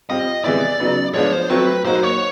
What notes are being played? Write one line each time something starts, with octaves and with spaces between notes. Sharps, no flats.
G3 C4 F4 D#5
C3 E3 G#3 B3 E4 D5
C#3 F#3 B3 D#4
F3 G#3 B3 D4 F4 C#5
C5
F#3 A3 C4 B4
F#3 A#3 D#4 F#4 C5
C#5